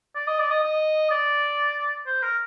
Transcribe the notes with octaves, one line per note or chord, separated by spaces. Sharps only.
D5
D#5
D5
D#5
D#5
D5
C5
A#4